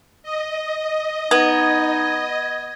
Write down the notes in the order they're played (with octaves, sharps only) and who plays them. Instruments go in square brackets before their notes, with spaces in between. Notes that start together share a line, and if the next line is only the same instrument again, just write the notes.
[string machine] D#5
[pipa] B3 [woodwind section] D#4 [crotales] G#6